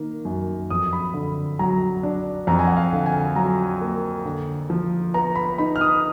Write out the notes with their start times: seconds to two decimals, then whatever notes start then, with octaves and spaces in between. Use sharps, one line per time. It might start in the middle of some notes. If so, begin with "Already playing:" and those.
Already playing: D#3 A#3
0.25 F#2
0.70 F2 D#6
0.93 B5
1.14 D3
1.59 F#3 A#5
2.03 D4
2.47 F2 A#5
2.59 G#5
2.67 F#5
2.77 F5
2.92 D3
3.06 G#5
3.36 F#3 A#5
3.81 A#3
4.25 D3
4.70 F3
5.14 B3 A#5
5.35 B5
5.58 D#4 B5
5.76 F6
5.81 D#6